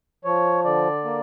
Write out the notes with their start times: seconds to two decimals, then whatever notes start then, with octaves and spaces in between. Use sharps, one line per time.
0.25 F3 C#5
0.65 D3 D5
1.04 A#3